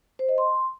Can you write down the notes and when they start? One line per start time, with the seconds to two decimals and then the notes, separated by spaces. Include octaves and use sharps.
0.19 C5
0.29 D#5
0.38 C6